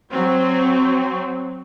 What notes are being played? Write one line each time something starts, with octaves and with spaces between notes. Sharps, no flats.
F#3 C4